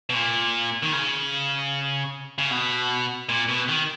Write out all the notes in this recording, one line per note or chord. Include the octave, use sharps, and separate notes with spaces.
B2
A#2
D#3
C#3
C#3
B2
A#2
B2
D#3